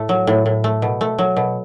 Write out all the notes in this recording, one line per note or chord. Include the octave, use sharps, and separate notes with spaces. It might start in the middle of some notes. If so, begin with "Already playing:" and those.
Already playing: A2 A3
F#3
A2
A2
A3
B2
A3
F#3
B2